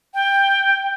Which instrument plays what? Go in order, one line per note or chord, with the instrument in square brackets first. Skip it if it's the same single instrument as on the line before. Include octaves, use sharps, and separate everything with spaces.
[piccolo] G5